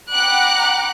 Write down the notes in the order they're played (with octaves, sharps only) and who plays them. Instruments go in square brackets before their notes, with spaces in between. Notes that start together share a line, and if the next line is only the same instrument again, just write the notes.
[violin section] F#5 G5 A#5 B5 D6 F#6